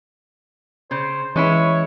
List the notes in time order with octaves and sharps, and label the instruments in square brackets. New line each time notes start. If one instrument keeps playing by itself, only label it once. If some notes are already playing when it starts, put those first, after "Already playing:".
[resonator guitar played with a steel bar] C#3 [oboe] C5
[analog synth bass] E3 [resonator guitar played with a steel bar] G#3 C#4 E4 [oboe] C#5